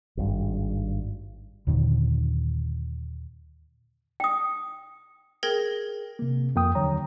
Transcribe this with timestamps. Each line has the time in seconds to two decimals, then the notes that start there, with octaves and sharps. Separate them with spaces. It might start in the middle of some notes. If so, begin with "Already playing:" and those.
0.17 G#1 G2
1.67 D#2 A#2 D3 D#3
4.20 G5 D#6
5.43 G#4 A#4 G5 G#6 A#6 F#7
6.19 C3 A#3
6.56 F2 A#3 G5 D#6
6.75 D#2 D3 F#3 C#5 A#5